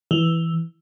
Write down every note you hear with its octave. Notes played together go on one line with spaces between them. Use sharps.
E3